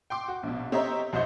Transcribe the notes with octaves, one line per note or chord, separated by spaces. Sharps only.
G5 C6 D6
F#4
A#1 B2
C4 G4 C#5 D#5 E5 A#5
C2 F#2 C5 D#5 G6